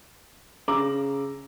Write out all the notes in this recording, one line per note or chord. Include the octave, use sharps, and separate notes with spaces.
C#3 A#5 D6 E6 F#7